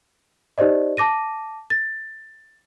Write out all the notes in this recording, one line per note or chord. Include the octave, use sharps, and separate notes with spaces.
D#4 G4 C5 D5 D#5
A5 D6 A#6 D#7
A6